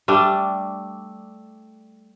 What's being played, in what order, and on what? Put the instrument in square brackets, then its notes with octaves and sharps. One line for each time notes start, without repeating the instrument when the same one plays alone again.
[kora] G3 A3 D4